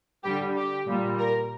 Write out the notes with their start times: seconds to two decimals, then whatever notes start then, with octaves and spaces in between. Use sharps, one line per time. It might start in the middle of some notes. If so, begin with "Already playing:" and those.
0.24 D3 G3 G4
0.56 G4
0.88 A#2 G3
1.19 A#4